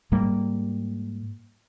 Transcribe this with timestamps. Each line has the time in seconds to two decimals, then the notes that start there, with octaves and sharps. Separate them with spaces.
0.12 G#2 G3 A#3